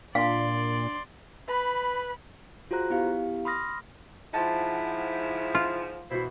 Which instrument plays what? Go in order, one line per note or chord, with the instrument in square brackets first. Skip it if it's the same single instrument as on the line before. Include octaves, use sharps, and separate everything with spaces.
[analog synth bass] A#2 [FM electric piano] D4 [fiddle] D5 C6 [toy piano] F5
[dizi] B4 [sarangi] B5
[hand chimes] F4 F#4 G#4 C5 A#5 F#6
B3 E4 G4 F5
B5 C6 D#6 F6 A#6
[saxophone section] G#2 F3 [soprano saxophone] E4 [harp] C5 F#5 A5
[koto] F4
[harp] B2 E3 F#4 [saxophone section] E4 C5